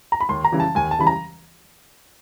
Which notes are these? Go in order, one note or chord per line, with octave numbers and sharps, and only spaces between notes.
A#5
B5
D#2 C6
A#5
C#3 E3 G3
A5
D#2 G#5
A5
C#3 E3 G3 B5
A#5